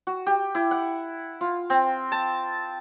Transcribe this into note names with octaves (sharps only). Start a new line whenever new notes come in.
F#4
G4
E4
F#5
F4
C4
A5